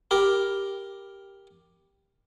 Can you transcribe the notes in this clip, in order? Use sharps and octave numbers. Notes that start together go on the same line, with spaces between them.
G4 A#4 B5